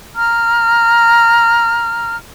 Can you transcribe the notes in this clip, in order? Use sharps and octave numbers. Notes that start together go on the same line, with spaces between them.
A#5 F6